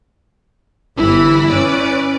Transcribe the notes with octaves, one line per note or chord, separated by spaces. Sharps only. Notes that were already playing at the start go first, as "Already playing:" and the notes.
G1 E3 E4 B5
C#4 B4 D5